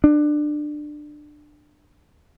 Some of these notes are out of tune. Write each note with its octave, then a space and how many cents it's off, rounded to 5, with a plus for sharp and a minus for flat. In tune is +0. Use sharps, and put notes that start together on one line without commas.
D4 +20